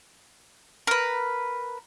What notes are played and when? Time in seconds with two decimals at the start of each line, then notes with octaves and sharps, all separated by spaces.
0.87 A#4 B4